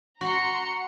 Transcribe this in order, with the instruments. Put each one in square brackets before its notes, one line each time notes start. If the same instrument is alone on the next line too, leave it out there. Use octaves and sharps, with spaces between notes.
[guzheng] F#4 [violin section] A#5 C6 C#7